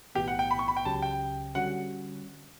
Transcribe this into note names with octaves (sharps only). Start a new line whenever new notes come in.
B1 A2 E3 B3 G4
F#5
G5
B5
C#6
B5
G5
C#2 C#3 F#3 C#4 G4 A5
G5
D3 G3 C#4 F#4 F#5